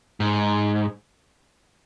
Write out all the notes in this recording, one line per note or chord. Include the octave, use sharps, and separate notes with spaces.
G#2